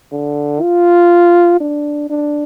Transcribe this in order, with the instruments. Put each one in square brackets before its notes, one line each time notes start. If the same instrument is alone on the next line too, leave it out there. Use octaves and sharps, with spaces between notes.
[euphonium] D3
F4
D4
D4